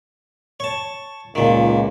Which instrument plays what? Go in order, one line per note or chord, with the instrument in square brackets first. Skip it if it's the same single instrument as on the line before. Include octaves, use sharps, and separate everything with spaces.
[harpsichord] C#5 A5
[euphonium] C#2 [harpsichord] A#2 D#3